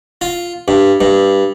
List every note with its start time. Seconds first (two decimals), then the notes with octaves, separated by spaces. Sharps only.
0.21 F4
0.68 G2
1.01 G2